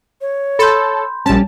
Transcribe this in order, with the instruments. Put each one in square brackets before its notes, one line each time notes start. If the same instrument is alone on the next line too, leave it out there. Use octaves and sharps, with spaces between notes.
[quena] C#5
[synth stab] A4 [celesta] B5 C6 G6
[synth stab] A#1 A5 [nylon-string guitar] G3 C#4